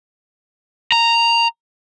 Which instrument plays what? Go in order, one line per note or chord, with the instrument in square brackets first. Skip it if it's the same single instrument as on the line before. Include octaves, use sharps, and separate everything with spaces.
[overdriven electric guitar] A#5